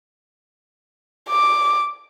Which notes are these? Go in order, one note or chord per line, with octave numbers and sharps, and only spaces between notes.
D6